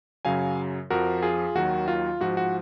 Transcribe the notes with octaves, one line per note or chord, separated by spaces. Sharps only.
F#2 C#3 F#3 F5 G#5
F2 F3 F#4 A#4
F4 G#4
D#2 D#3 F#3 F#4
F4
G#2 F3 F#4
F#4